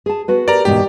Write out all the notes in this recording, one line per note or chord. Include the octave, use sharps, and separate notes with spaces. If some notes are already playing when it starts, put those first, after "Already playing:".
G#4 A5
B3 F#4 B4
G4 A#4 D5 A#5
E2 G#2 B2 G4